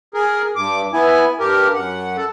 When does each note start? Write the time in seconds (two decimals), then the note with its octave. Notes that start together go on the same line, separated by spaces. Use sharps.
0.14 G#4 A#4
0.56 G2 D6
0.94 B3 E4 G#5
1.40 G2 G4 A#4
1.74 F#2 F#5
2.17 A4